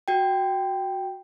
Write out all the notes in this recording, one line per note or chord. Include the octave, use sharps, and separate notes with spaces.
F#4 G5